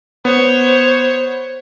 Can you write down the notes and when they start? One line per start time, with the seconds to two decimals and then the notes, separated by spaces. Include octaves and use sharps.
0.25 B3 C5 C#5